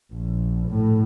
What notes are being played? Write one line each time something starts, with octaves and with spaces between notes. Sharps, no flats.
A#1
A2